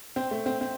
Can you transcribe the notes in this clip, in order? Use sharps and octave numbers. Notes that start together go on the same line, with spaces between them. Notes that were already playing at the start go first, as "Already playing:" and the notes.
C4
A3
C4
C4